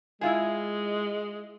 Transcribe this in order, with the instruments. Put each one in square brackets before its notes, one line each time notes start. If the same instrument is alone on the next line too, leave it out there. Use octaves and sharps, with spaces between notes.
[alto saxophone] G#3 [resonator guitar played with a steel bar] E4 F4 G#4